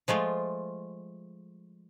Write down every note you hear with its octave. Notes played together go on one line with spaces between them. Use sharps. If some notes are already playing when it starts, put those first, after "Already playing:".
F3 G#3 A3 F4